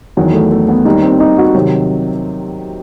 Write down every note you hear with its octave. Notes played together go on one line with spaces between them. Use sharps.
E2 D#3 F#3 B3
A3
A3
B3
D#2 D#3 G3 D#4
C4
D#4
F#4
C3 D#3 F#3